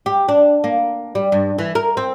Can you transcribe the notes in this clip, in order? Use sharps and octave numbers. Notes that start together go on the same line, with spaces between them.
G4
D4
A#3
G3
G2
E3
A#4
C4